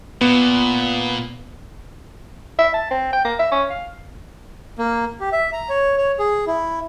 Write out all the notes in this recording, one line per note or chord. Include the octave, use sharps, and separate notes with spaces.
A#2 B3
E5
A5
C4
G5
A#3
E5
C#4
F5
A#3
G4
E5
A#5
C#5
C#5
G#4
E4